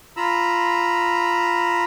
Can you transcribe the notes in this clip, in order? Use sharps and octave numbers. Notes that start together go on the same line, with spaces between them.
F4 A#5 B5 E6